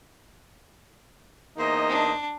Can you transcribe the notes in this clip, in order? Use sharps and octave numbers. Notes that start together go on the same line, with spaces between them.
E2 A#3 D#4 C5 D#5
D4